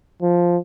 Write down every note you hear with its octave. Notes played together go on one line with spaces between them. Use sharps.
F3